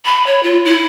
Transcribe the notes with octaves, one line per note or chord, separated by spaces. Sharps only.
B5
C#5
F4
E4